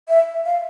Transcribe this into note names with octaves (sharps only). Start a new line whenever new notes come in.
E5
F5